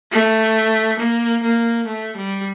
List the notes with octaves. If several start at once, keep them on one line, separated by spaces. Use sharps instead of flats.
A3
A#3
A#3
A3
G3